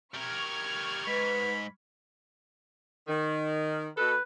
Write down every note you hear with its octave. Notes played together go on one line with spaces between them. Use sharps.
G3 A#4 C#6 F6 G#6
G#2 B4 B5
D#3
B2 A4 B4